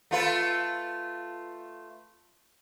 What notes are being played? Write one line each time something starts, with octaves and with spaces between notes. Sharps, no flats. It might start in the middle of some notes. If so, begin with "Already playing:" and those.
A3 F4 B4